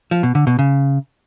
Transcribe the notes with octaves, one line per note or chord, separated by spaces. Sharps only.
F3
B2
D3
B2
C#3